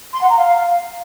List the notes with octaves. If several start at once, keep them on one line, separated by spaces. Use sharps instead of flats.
C6
F#5
A#5
F5